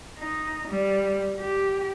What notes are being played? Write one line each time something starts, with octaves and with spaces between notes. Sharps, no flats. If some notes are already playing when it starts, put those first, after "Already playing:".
D#4
G3
G4